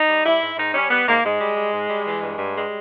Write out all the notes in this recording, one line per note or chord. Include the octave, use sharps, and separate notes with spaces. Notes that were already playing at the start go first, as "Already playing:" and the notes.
Already playing: D#4
G3
G3 E4
G#2
G#2 D#4
G3 C#4
G3 B3
G#2 A#3
G#2 G#3
G3
G3
G#2
G3
E3
G2
G2
G3 G#3